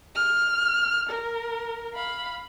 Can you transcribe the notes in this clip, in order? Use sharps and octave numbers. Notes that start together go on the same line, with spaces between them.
F6
A#4
F5 B5